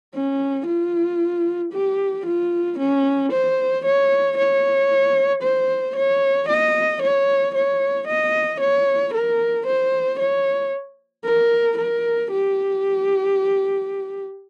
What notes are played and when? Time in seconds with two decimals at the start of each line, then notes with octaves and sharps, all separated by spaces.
0.14 C#4
0.67 F4
1.73 G4
2.26 F4
2.78 C#4
3.32 C5
3.85 C#5
4.37 C#5
5.43 C5
5.96 C#5
6.49 D#5
7.02 C#5
7.54 C#5
8.07 D#5
8.60 C#5
9.13 A#4
9.66 C5
10.19 C#5
11.24 A#4
11.77 A#4
12.31 G4